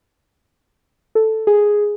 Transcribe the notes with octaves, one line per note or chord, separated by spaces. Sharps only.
A4
G#4